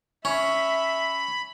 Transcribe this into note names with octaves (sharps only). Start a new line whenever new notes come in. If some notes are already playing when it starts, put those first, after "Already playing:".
C#4 E5 B5